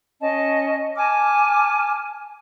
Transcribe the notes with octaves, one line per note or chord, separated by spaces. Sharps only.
C#4 D#5 A5
G#5 A5 D6 F6